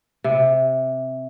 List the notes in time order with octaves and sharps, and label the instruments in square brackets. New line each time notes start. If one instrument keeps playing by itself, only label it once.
[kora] C3